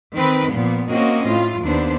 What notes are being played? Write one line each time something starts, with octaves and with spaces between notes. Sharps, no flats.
D#3 C4 B4
A#2 F3 B3
A#3 C4 C#4 F#4 D#5
A2 F4
D#2 B3 D4 C5